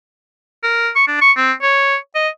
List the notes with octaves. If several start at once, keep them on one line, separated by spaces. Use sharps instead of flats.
A#4
C#6
D4
C#6
C4
C#5
D#5